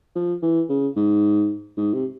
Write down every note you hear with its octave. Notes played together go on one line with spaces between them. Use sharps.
F3
E3
C#3
G#2
G#2
C3